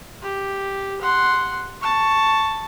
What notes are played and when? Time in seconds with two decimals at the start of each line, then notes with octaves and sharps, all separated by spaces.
0.22 G4
1.01 F#5 C6
1.82 A5 C#6